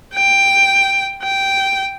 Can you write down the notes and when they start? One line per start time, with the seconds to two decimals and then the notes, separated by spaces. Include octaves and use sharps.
0.14 G5
1.22 G5